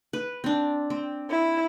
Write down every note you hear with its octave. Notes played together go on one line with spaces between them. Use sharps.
B4
C4 D4
C4
E4